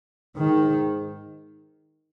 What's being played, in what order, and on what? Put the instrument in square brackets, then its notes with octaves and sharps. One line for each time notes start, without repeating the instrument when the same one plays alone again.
[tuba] G#2 [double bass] D#3